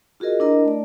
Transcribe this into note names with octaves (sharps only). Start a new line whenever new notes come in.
F4 F#4 G#4 A#4 D#5
D4 E4 A#4 D#5 A#5
A3 D5